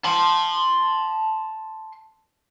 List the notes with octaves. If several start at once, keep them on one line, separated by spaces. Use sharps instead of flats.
A5 C6